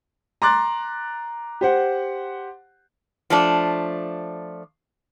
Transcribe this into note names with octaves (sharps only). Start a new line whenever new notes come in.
A#5 C6 D6 F#6 A6
G4 C5 F#5
F3 A3 D4